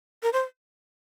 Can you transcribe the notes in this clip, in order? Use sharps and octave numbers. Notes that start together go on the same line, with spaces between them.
A#4
C5